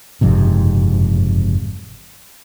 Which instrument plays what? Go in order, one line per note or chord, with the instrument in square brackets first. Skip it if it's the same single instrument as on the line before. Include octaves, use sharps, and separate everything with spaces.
[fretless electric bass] F#1 F2 G#2 C3